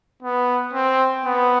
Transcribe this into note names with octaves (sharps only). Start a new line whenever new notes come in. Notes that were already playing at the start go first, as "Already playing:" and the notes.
B3
C4
B3